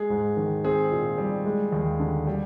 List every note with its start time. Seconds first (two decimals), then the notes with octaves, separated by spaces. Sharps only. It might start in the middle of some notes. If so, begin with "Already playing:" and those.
Already playing: G#3 G#4
0.10 G#2
0.37 D#3
0.64 C4 G#4
0.92 A#2
1.18 G3
1.46 G#3
1.72 D#2
2.00 D3
2.27 G3